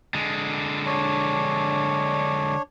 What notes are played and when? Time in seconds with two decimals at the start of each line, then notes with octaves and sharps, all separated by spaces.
0.14 D3 G#3
0.86 D4 C#5